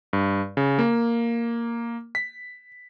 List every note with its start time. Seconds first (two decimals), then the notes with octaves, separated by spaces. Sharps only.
0.13 G2
0.57 C#3
0.79 A#3
2.15 B6